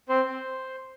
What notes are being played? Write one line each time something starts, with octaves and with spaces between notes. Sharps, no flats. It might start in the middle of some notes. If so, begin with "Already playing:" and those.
C4 C5
C4